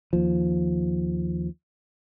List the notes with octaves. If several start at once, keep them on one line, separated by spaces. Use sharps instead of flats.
D#2 F3